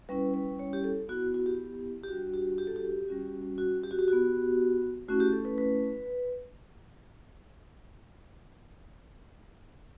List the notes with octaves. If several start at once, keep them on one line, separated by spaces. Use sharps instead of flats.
G3 C#4 E4 B4
B4
C#5
G4
A4
B3 E4 F#4
F#4
G4
G4
G3 D4 F#4
G4
G4
A4
G4
G3 C#4 F#4
F#4
G4
F#4
G4
F#4
B3
A3 C#4 E4 F#4
G4
A4
B4
B4